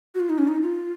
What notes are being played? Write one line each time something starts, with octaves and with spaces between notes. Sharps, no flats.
F#4
F4
D#4
C#4
D#4
F4